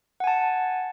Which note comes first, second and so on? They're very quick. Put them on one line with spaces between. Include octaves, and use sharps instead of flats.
F#5 G#5 A5